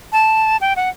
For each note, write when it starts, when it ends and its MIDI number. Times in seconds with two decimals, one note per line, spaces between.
0.12 0.57 81
0.61 0.73 79
0.76 0.89 78